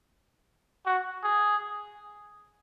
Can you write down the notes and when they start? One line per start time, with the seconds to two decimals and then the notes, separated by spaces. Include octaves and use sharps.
0.86 F#4
1.23 G#4